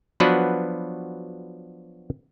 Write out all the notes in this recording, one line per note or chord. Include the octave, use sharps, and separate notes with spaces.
F3 F#3 B3 D4 F#4 B4